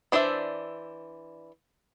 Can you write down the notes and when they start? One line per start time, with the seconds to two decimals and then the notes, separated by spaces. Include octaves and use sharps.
0.12 E3 D4 C5 D5 E5